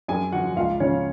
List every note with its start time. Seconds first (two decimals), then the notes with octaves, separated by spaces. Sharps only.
0.08 F#2 G#4 G#5
0.32 D3 F3 F#4 F#5
0.56 C#2 F4 F5
0.80 C#3 F3 C#4 C#5